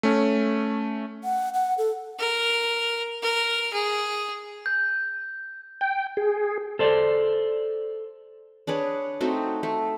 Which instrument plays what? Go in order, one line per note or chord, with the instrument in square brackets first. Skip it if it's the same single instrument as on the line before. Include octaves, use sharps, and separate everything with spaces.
[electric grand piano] A3 C#4
[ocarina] F#5
F#5
A4
[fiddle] A#4
A#4
G#4
[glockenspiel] G6
[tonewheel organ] G5
G#4
[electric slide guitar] A4 C5 D5
[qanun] D4 G#4 B4 C#5
A3 C4 D#4 F#4
A3